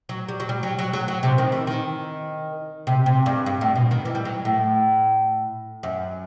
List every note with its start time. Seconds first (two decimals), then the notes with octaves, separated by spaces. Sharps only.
0.09 F#3
0.29 G3
0.40 F#3
0.49 G3
0.63 F#3
0.79 F#3
0.93 F#3
1.08 F#3
1.23 C3
1.38 D#3
1.52 E3
1.67 D#3
2.87 C3
3.06 C3
3.26 G2
3.46 G2
3.61 A2
3.76 B2
3.91 D#3
4.05 E3
4.15 G3
4.25 F#3
4.45 A2
5.83 F#2